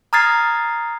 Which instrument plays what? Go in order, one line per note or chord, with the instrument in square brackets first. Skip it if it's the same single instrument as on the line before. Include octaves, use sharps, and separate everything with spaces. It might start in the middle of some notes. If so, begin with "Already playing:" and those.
[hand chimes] A#5 D#6 F6 G#6 A6 C7